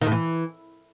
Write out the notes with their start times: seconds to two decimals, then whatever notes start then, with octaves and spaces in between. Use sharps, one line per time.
0.01 D#3
0.07 A2
0.12 E3